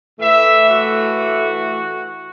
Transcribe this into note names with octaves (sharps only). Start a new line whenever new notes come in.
A2 E3 A3 E5
F#4